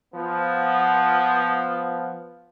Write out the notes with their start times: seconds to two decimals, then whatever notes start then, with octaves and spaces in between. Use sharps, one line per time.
0.14 F3 B3